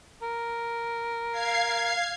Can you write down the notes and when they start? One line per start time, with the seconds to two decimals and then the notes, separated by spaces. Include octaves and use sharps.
0.22 A#4
1.32 F5 G#6 C7